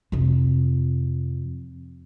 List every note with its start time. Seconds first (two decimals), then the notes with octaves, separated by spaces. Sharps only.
0.12 F2 C3